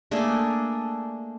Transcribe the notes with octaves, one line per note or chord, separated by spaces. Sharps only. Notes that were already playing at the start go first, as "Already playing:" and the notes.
A3 A#3 D4 G#4